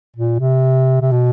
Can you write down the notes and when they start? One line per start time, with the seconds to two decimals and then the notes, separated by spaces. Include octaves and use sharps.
0.16 A#2
0.40 C3
1.02 C3
1.11 B2